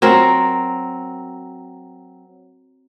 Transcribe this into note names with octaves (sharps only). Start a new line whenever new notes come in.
F#3 C4 A#4